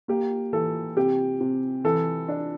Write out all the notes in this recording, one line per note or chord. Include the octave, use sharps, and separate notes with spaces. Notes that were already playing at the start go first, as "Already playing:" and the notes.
A#3 G4
E3 A4
C3 G4
C3
E3 A4
D4